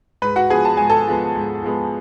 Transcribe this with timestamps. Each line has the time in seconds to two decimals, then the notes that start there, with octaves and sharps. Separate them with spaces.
0.22 G#2 B4 B5
0.36 F#4 F#5
0.50 F3 G#3 B3 G#4 G#5
0.65 A5
0.77 G#2 G#5
0.90 A4 A5
1.07 F3 G#3 B3
1.35 G#2
1.64 F3 G#3 B3